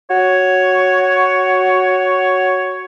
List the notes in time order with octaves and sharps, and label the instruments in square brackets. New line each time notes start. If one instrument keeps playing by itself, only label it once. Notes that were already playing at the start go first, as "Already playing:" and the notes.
[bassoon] F#4 [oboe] C#5